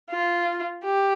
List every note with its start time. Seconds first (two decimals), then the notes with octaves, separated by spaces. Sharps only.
0.11 F4
0.85 G4